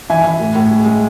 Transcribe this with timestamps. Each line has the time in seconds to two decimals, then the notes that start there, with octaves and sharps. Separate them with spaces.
0.10 E3 E5 G#5
0.24 E3
0.40 A2
0.55 A2
0.71 G#3
0.86 G#3